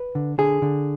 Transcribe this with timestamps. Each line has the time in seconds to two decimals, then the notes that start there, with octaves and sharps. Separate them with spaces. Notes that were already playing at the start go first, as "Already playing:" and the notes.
Already playing: B4
0.15 D3
0.38 D3 G#4
0.62 D3